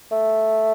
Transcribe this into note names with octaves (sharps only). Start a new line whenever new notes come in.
A3